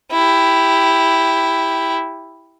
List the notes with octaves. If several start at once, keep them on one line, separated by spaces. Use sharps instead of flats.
E4 G4